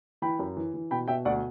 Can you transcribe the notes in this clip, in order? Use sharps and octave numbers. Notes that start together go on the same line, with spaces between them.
E3 G5 B5
F#2
E3
E3
B2 G5 B5
B2 E5 G5
D2 D5 F#5